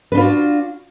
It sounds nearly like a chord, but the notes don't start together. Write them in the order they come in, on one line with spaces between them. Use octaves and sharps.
B4 D4 F4 F#4